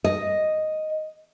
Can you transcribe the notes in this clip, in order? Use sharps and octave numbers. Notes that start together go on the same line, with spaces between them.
D#5